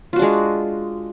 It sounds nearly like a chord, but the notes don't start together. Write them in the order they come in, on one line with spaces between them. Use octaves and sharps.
F4 F#4 D4 G#3